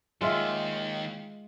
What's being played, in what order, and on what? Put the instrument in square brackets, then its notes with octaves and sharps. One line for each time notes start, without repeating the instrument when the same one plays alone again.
[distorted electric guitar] D#2 D#3 [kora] G#3 F4 E5